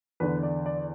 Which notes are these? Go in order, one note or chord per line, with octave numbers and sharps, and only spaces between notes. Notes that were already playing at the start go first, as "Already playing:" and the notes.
E2 D3 B4
D5
D5